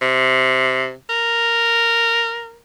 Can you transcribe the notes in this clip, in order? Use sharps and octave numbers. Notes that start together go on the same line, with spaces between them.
C3
A#4